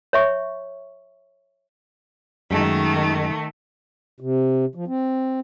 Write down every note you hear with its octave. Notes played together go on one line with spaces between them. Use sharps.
C#5 E5 C#6
F#2 D#3 G#3 A3 A5
C3
F3
C4